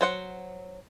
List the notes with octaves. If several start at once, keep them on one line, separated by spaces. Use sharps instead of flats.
F#3 C5 F#5